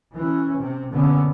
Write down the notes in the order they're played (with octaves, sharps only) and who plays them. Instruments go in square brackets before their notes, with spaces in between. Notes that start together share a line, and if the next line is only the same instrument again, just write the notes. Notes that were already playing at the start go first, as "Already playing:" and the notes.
[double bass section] E3 C#4
C3
F#1 B2 D3 B3 C#4